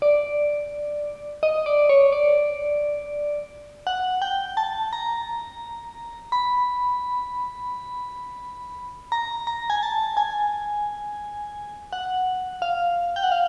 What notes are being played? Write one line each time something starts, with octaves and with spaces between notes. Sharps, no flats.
D5
D#5
D5
C#5
D5
F#5
G5
A5
A#5
B5
A#5
A#5
G#5
A5
G#5
F#5
F5
G5
F#5
F5